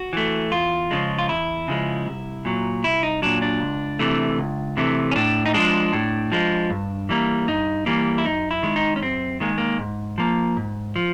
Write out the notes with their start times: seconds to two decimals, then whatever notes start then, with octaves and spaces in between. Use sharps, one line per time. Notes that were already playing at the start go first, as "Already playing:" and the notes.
Already playing: F#4
0.13 E3 A3
0.51 E2 F4
0.91 C#3 F3 G#3
1.19 F4
1.29 E2 E4
1.68 C#3 F3 G#3
2.07 C2
2.45 A#2 F#3
2.84 C2 E4
3.03 D#4
3.22 A#2 F#3 D4
3.42 D4
3.60 C#2
3.99 C3 E3 A3
4.38 C#2
4.77 C3 E3 A3
5.11 C#4
5.16 A2 D4
5.46 D#4
5.54 F3 G#3 D4
5.93 A2
6.32 F3 G#3
6.70 G2
7.09 E3 G3 A#3
7.47 G2 D#4
7.86 E3 G3 A#3
8.18 E4
8.24 F#2 D#4
8.51 E4
8.63 D#3 G#3
8.76 D#4
8.96 C#4
9.02 F#2 C4
9.40 D#3 G#3 A#3
9.58 A#3
9.79 G#2
10.18 F3 A#3
10.57 G#2
10.96 F3